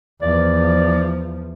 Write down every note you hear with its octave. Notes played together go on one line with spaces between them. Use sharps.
E2 F3 D5